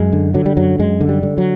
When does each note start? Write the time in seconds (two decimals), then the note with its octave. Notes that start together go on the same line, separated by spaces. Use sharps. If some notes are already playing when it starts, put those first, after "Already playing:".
Already playing: F#2 G#3
0.13 D3
0.34 D3 F#3
0.46 G3
0.57 F#2 F#3
0.79 F#2 G#3
1.01 D3
1.09 G3
1.23 D3
1.38 F#3